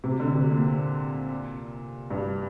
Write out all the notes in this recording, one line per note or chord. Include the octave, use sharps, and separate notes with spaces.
C3
D3
C3
A#2
G2